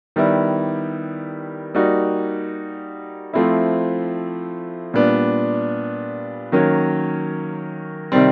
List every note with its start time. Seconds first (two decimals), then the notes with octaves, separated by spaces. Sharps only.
0.16 D#3 G3 B3 E4
1.75 G3 A#3 D#4 F#4
3.33 F3 A3 C4 E4
4.94 A#2 G3 B3 D4
6.52 D#3 F#3 A#3 C#4
8.12 C3 D#3 G3 C4